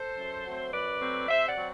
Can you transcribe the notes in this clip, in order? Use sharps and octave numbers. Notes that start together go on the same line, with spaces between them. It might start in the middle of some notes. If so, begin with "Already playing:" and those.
Already playing: A4 C5
F#2
F#3 A3 C4
F#2 B4 D5
F#3 A3 C4
C3 C5 E5
D5 F#5
F#3 C4